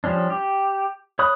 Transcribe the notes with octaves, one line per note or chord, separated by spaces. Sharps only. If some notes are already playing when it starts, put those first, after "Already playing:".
F3 G3 C#4 D4
G4
C#5 B5 D#6 F#6